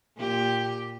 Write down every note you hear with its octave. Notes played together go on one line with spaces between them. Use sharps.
A#2 G4